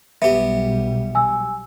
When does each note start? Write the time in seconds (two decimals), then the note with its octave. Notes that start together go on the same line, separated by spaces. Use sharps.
0.22 B1 G3 B3 G4 E5
1.15 G#5 E6